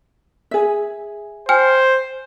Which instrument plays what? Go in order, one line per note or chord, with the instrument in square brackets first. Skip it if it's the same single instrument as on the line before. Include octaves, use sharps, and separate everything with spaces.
[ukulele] G#4 E5
[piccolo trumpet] C5 [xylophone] G5 G#5 F6